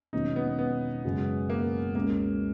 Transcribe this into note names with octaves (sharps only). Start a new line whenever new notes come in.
E1 E2 D#3 F#3 C#4 D#4
B3
B3
F#2 C#3 G#3
A#3
C#2 B2 G#3 A#3 C#4 F#4